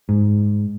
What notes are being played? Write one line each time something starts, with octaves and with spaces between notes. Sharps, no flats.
G#2